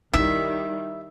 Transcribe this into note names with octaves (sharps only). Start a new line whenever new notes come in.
D#3 G3 D#4 E4 E5